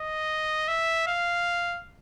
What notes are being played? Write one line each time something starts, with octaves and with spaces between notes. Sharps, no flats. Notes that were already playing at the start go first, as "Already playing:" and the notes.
Already playing: D#5
E5
F5